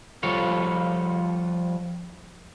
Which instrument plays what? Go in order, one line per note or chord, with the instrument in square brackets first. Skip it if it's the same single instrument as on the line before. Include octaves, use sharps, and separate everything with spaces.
[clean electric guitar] F3 G3 F4 A4 C#5